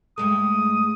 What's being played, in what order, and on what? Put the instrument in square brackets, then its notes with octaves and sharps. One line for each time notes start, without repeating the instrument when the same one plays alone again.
[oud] G2 G#3 A3 [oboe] D#6